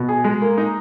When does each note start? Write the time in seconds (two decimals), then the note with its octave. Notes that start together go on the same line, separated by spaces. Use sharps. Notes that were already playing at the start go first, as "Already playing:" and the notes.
Already playing: B2
0.09 G#4
0.24 G#3
0.42 A#3
0.58 D#4